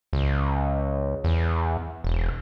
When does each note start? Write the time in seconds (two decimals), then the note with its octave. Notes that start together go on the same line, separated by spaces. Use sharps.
0.13 C#2
1.24 E2
2.04 E1